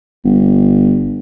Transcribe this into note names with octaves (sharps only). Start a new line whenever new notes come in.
G1